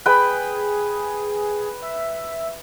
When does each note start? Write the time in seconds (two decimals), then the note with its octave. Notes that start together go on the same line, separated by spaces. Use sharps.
0.06 G#4 B4 G5 B5
1.82 E5